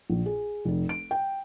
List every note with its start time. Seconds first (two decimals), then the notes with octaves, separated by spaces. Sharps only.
0.10 A#1
0.26 G#4
0.65 F1
0.89 D7
1.11 G5